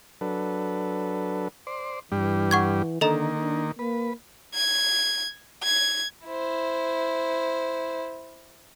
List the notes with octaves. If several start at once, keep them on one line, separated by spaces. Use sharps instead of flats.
F#3 D4 A4 B4
C5 D5
G2 E3 G3 D4
F#5 C#6 G#6
D3 D#3 A#3 A4 D#5 A#5
D4
A#3 B4
G#6
G#6
E4 C5